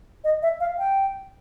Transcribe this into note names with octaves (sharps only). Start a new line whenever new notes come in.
D#5
E5
F5
G5